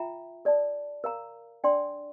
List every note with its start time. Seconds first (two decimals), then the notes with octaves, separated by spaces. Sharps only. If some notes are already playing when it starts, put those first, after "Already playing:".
Already playing: F4 E5 G5 A#5
0.45 A4 D5 A5
1.04 A#4 F5 A#5
1.64 D4 A4 D5 G5 C6